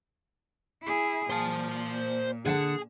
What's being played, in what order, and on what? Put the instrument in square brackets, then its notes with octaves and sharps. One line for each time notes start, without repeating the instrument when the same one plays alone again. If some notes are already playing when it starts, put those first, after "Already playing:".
[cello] E4 G#4
[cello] A#2 [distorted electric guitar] C5 A5
[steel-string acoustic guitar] D3 F#5 A5 [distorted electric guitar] G#4